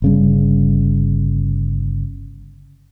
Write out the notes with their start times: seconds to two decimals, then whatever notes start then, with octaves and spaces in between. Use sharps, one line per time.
0.02 G1 C#3 G3